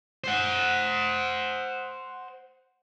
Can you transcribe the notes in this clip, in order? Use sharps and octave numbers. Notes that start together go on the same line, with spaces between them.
C5 F#5